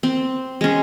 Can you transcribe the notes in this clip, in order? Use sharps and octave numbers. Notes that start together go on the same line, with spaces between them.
C4
G#3 C#4